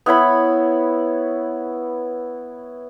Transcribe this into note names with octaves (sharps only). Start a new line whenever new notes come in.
B3 E4 C#5 B5